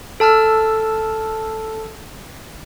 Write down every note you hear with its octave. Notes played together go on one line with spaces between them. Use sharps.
A4 A5 E6 F6